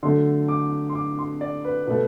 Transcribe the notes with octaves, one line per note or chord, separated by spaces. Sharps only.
D3 F#3 A3 C6
D6
C6
D6
C6
D5
B4
B2 A3 B4